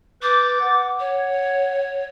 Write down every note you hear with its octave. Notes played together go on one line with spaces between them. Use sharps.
B4 D6 G6 A6
F#5
C#5